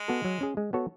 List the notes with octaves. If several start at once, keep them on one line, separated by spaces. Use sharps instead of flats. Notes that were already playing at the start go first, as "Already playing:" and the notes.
Already playing: G#3
B3 F#4 A4
F#3
C#4 G#4
G#3
B3 F#4 A4 C#5